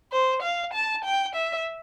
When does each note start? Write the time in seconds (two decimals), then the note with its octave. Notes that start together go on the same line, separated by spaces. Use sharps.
0.12 C5
0.42 F5
0.73 A5
1.05 G5
1.35 E5